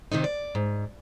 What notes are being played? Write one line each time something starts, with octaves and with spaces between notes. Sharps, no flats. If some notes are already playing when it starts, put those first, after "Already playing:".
C3 D#3 C4 D#4
D5
G#2